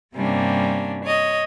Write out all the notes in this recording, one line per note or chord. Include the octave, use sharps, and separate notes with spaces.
G2 C3 G3 A#3 C#4 D4
C#5 D#5